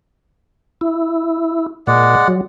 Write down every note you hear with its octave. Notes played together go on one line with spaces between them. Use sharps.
E4
A#2 G#3 D5 F#5
F#3